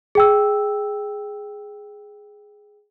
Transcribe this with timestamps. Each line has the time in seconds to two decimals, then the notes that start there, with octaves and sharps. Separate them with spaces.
0.15 G#4 G5 E6